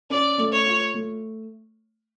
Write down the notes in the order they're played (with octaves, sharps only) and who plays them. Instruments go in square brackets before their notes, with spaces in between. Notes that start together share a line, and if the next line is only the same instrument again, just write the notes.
[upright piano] C#4 [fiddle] D5
[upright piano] A3
[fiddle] C#5
[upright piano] F4
A3